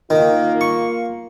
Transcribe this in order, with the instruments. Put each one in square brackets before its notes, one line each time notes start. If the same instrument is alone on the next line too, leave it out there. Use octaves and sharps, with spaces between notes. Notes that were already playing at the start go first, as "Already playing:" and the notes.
[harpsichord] D#3 [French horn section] A#3 F4
[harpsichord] C#6